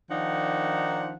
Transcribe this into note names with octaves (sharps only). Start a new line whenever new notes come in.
D#3 F3 D4 D#4 F#5